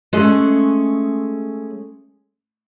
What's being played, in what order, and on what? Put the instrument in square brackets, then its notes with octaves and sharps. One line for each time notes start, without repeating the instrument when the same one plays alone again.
[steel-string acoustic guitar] G#3 A3 C#4 G#4 A4